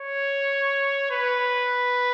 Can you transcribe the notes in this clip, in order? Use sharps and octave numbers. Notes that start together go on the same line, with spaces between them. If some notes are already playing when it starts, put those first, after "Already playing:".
Already playing: C#5
B4